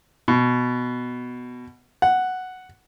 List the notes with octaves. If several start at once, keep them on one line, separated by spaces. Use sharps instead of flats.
B2
F#5